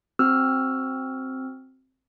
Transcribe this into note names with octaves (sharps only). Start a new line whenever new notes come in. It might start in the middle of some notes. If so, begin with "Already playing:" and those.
C4 F#4 E6 F6